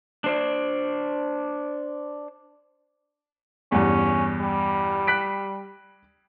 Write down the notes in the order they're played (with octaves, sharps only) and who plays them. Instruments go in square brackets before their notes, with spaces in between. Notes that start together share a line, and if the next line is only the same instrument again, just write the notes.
[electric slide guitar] D4 C5 D5
[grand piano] E2 G2 [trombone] C#4
[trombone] G3
[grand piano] F#6 B6 D7